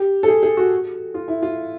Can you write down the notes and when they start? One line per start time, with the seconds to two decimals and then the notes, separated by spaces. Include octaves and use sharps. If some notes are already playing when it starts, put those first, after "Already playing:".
Already playing: G4
0.23 A4
0.28 G#4
0.43 G#4
0.57 F#4
1.14 F4
1.28 E4
1.42 F4